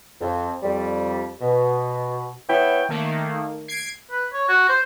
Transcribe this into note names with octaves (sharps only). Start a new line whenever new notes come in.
F2
F2 G3
B2
B3 E4 C#5 G5
D#3 A3 A#3
G#6 C7 D7
B4
C#5
F#4
C5